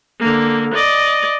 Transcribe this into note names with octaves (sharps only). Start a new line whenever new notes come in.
D3 A#3
D5 D#5